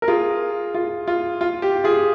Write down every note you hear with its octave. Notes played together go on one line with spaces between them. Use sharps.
A#4
F4 G#4
F4
F4
F4
G4
F4 G#4